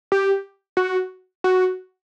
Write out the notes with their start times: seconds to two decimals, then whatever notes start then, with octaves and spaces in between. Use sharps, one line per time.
0.12 G4
0.77 F#4
1.44 F#4